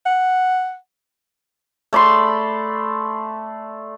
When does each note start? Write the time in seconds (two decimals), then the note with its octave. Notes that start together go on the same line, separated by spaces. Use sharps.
0.06 F#5
1.93 A3 D5 B5 C6